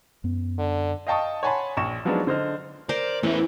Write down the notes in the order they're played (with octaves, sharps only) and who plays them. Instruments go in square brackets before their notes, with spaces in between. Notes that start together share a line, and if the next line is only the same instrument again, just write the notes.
[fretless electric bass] F#2 B3
[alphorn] D3
[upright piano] D#5 F5 G5 A5 C#6 D#6
C#5 F#5 G#5 A5 B5 C6
A#1 C#6 E7
F3 F#3 G#3 B3 D4 D#4
D3 C5 D#5 F6
[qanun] A#4 C5 [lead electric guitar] D5
[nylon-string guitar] E2 [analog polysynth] E3 [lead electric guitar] A3 C#4